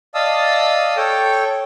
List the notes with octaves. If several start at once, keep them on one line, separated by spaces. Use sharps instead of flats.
D5 D#5 F5 A5 D#6 E6
A4 C#5 G5